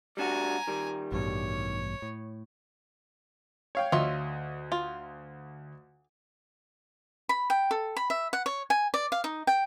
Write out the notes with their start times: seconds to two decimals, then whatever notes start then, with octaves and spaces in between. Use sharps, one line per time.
0.17 G3 D4 F#4 G#5 A#5
0.67 D#3 G3
1.12 A1 G2 B2 C#5
2.02 A2
3.75 C#5 F5 G5
3.92 D2 F4 C#5 D#5 E5
4.72 F4
7.29 B5
7.50 G5
7.71 A4
7.97 B5
8.10 E5
8.33 F#5
8.46 C#5
8.70 G#5
8.94 D5
9.12 F5
9.24 D#4
9.47 G5